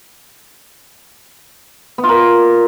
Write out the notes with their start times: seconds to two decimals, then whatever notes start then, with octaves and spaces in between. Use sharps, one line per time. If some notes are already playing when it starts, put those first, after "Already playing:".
1.98 B3
2.03 F4
2.09 A#4